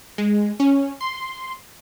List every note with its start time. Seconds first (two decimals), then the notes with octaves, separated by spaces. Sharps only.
0.18 G#3
0.60 C#4
1.01 C6